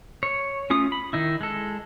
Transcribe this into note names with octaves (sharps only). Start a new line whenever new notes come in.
C#5
A3 C#4 F4 D#6
B5
D#3 D#4 E4
G#3 A4